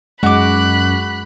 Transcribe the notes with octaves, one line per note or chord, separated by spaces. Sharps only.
F#2 G#3 F#4 B5 D6 F#6